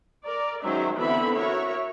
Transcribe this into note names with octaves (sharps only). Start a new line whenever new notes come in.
A#4 D5
D#3 F#3 G#3 C#4 C5 E5
D3 E3 B3 C4 E5 B5
F#4 A#4 C#5 E5